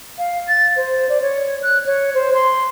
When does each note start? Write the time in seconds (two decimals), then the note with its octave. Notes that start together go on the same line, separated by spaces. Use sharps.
0.18 F5
0.48 A6
0.77 C5
1.09 D5
1.22 C#5
1.63 F#6
1.86 C#5
2.14 C5
2.34 C6